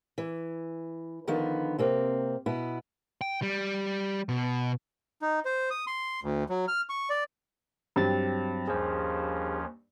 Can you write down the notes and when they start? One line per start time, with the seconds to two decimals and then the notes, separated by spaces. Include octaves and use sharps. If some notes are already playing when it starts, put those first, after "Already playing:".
0.18 E3
1.27 D3 D#3 F3 B3
1.79 C3 A#3 C4
2.46 B2 B3 E4
3.21 G5
3.42 G3
4.29 B2
5.22 D#4
5.45 C5
5.71 D#6
5.87 C6
6.23 D2
6.49 F#3
6.68 F6
6.89 C#6
7.10 D5
7.96 G2 F#3 C4 A6
8.68 D#2 F3 C#4 G#4 C5